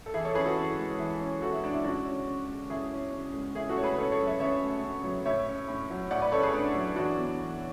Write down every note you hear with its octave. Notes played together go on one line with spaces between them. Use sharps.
A4
E3 E4 G#4
A4 C#5
C#4 G#4 B4
F#4 A4
E3
G#3
E3
C#4
E3 F#4 A4
E4
G#3 D4
E4
C#3 D4 F#4
C#4
C#3
G#3
C#3 E4 G#4
C#4
C#3
G#3
C#3 E4 G#4
F#4 A4
A3 C#5
G#4 B4
C#3 A4 C#5
A4 C#5
F#3
C#5 E5
C#3 C#5 E5
A3
C#3
F#3
A2 C#5 E5
C#4
A2
F#3
A2 D5 F#5
B4 D5
C#4 A4 C#5
G#4 B4
A2 D4
F#3
E3 D4 F#4
B3
E3